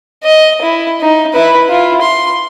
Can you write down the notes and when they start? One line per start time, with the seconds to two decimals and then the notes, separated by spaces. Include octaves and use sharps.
0.23 D#5
0.62 E4
1.01 D#4
1.34 E4 B4
1.69 E4 F4
2.01 C6